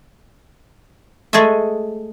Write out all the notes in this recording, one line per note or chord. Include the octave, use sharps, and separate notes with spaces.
G#3 A3 G#4 A4 D#5 E5